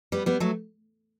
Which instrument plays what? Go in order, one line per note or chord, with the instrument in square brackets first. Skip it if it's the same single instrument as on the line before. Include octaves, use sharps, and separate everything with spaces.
[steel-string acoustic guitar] G3 B3
G3 B3
F#3 A3